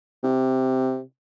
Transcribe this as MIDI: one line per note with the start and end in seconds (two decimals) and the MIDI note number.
0.24 1.02 48